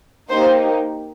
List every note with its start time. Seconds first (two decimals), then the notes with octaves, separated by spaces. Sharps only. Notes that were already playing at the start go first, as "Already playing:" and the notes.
0.29 A#3 D#4 G4 C5